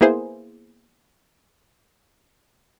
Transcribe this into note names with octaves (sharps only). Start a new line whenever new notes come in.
A#3 B3 E4 G#4 C5